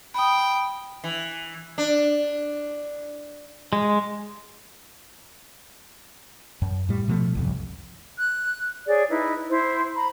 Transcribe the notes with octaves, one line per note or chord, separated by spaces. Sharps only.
G5 B5 D#6
E3
D4
G#3
F#2
A2 G3
B2 F3 A3
G1 C2 F2
F#6
G#4 C#5 D5
D#4 E4 B4
E4 C5
A#5 B5